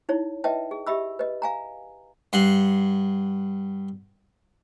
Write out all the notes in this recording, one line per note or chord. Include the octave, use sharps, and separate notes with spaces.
D#4 E4 C#5
B4 D#5 E5 G5 A5
G#4
G4 D#5 E5 B5 E6
B4 D#5
F5 G#5 A#5
G2 F#5 C6